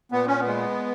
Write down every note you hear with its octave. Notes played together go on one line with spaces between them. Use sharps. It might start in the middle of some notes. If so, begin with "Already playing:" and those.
A#2 B3
C#4
B3
G#3